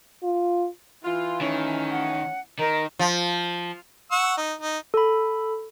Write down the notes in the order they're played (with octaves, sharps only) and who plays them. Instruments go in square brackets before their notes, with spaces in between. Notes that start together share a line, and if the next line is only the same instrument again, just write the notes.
[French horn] F4
[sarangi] E3 [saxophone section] F4
[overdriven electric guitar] D#3 [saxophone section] F3 A3 C#4
[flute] F#5
[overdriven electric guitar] D#3 [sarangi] D#4 [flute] A#4
[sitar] F3
[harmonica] F#5 C#6 E6
D#4
D#4
[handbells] A4 B5